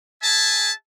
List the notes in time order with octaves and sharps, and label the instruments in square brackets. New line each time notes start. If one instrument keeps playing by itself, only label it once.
[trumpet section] G#4 E5 G#5 A5